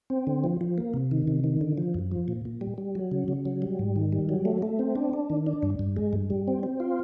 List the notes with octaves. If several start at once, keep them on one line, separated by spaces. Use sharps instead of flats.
C4
D3
F3
F3
A#3
C3
D#3
C3
D#3
D3
F3
F#2
F3
A#2
A#2
G3
G3
F#3
C#3
C#3
F#3
G3
G#2
D#3
G3
F#3
A3
A3
C4
D4
D4
D#3
D4
G2
G2
G#3
G2
G3
C4
C4
F4